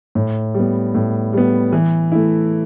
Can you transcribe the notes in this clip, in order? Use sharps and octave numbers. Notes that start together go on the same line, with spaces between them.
A2
G3 B3
A2
G3 B3
E3
A3 E4